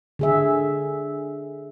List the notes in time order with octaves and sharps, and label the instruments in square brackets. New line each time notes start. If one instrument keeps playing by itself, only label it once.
[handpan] D3 G#4 E5